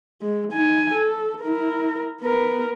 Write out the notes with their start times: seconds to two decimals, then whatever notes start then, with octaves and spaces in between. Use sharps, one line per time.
0.22 G#3
0.52 D#4 G#5
0.94 A4
1.42 E4 A#4
2.21 B3 A#4